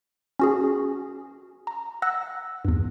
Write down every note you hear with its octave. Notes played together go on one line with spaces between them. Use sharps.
C#4 F#4 G#4
A#5
F#5 E6 F#6 A#6
E2 G2